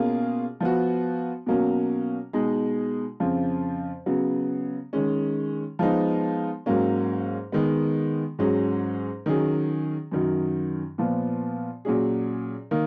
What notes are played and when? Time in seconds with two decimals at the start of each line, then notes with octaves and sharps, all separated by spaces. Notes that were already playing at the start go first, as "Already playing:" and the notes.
Already playing: B2 A#3 C#4 F4 G#4
0.60 F3 B3 F#4
1.47 B2 F#3 A#3 C#4
2.33 B2 G#3 D#4 G#4
3.20 F2 C#3 F3
4.06 C#3 F#3 B3
4.93 D#3 G#3 C#4
5.79 F3 G#3 B3 D#4
6.66 G#2 F#3 A#3 C#4
7.52 D#3 G#3 B3
8.39 G#2 F#3 C#4 G#4
9.26 D#3 F#3 C#4 G#4
10.12 F#2 D#3 F#3
10.98 A#2 F3 B3
11.85 A#2 F#3 C#4 G#4
12.71 D#3 A#3